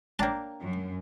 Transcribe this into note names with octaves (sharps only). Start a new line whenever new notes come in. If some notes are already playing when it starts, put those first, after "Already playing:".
A#3 D4 C#5 G5 A5 A#5
F#2